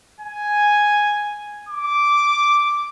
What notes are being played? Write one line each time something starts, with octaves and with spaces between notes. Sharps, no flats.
G#5
D6